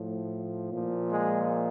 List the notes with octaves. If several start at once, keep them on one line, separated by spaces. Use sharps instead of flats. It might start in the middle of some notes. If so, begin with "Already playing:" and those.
Already playing: A2 F3
A#2 F3
G#3